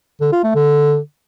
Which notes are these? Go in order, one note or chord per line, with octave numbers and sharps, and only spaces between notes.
D3
F4
A3
D3